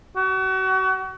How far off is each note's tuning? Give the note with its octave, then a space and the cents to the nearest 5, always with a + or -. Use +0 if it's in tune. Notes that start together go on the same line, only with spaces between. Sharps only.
F#4 +35